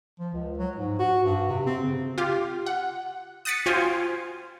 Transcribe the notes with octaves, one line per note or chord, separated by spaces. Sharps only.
F3
C#2
F#3
G#2
F#4
G2
C3
C4
C#3
F4 G4 F5
F#5
D#6 F#6 A6 B6 C#7
F4 F#4 C5 F5 G5 G#5